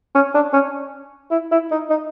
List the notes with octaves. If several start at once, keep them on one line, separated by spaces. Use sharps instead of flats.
C#4
D4
C#4
E4
E4
D#4
D#4